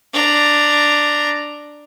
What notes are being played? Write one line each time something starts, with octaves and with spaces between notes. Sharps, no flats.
D4 A#5